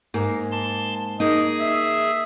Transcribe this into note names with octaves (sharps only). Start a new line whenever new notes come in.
G#2 A#3
A5 C6
A#3 D#4 G#4 D#5
E5